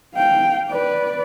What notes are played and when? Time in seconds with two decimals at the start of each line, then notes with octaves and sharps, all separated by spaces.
0.15 F5 G5
0.70 B4 D5